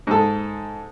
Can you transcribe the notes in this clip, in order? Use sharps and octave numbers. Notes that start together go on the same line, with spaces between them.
G#2 A4